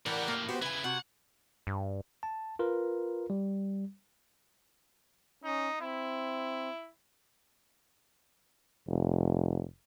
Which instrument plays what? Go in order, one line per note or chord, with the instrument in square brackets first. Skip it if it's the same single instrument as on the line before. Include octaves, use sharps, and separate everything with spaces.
[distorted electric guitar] A2 G4 [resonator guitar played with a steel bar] E3 [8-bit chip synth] A#4 D5 F#5
[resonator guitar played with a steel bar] A#3
[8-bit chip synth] B3 G4 C5 [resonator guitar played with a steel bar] F#4
[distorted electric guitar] C#3 E4 [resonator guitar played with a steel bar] B4 G#5 [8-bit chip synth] G#6
[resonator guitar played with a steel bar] C3 F#4 [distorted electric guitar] F#5
[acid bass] G2
[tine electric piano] A5
F4 A#4 B4
G3
[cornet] C#4 [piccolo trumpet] D#4
[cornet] C4 [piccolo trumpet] E4
[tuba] F1